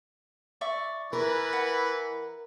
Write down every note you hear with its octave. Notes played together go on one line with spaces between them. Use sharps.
D5 E5 C#6
E3 A#4 B4
F#5